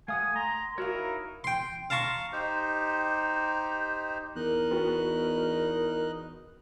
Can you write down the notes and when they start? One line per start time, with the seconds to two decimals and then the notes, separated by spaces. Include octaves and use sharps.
0.08 A3 F5 F#5 G#5 D#6
0.36 A#5 C6
0.78 D#4 E4 F#4 A#4 C#5 F5
1.44 G5 C6
1.90 F5 A5 A#5 C6 C#6
2.33 D#4 G4 C5
4.36 E2 D#4 A#4 D#5 F#6
4.71 B3 F#4